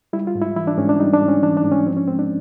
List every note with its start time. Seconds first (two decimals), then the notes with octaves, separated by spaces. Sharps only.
0.13 G3 E4
0.27 F4
0.35 G#2
0.41 E4
0.56 E3 E4
0.67 D4
0.78 G#2 C#4
0.89 D4
1.00 G3 D#4
1.14 D4
1.22 G#2
1.28 C#4
1.43 E3 D4
1.57 D4
1.64 G#2
1.72 C#4
1.86 F3 C4
1.97 C#4
2.07 G#3 C4
2.19 D4